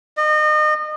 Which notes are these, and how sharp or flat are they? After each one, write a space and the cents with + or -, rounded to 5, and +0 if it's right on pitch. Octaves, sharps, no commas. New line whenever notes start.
D#5 -35